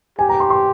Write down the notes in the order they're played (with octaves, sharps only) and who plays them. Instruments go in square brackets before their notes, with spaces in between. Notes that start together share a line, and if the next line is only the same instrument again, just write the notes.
[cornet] G4 [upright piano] G#5
[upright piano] A#5
C6
C6